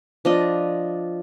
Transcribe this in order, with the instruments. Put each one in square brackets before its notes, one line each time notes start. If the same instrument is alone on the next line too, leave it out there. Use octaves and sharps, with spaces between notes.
[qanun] F3 D4 D#5